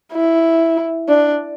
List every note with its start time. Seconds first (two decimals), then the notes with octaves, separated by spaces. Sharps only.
0.13 E4
1.09 D4